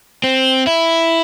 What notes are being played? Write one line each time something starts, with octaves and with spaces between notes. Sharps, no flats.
C4
E4